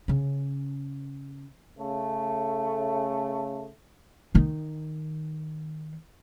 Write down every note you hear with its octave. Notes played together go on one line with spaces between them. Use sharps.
C#3 C#4
C#3 A3
D#3 D#4